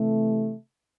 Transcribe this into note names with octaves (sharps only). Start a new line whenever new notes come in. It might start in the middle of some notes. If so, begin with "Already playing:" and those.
Already playing: C3 E3 A3